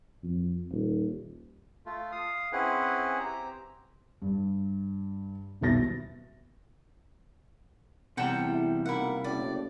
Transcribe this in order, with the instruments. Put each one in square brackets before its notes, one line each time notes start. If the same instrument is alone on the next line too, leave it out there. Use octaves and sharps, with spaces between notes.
[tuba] F2
D#1
[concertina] A3 F4
F5 D#6
C4 C#4 E4 G#4 B4 F#5
C4 G4 A#5
[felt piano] G2
D#1 B1 B3 E5 A6 A#6
[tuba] E2 [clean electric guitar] C3 G3 A5 [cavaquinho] F#5 G5 A#5
[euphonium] E4
[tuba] B1 [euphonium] A#3 [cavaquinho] E4 F#5
[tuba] F#1 [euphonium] A2 [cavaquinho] D5